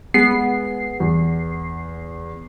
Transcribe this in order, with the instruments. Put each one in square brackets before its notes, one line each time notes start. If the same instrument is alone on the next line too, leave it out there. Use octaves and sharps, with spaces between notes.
[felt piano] G#3 [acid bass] B3 [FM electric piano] C7
[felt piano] E2